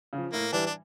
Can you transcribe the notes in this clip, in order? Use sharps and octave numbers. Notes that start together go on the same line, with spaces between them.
C#3 F3
A2 A#3
E3 G3 D4
D4